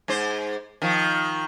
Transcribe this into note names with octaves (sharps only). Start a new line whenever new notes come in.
G#2 C5
D#3 F3